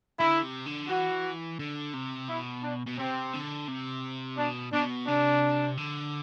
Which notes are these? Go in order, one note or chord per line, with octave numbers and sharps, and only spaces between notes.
D3 E4
C3
D3
E3 F#4
D3
C3
B2 E4
D4
B2
C3 C4
D3
C3
B2 D4
B2 D4
C3 D4
D3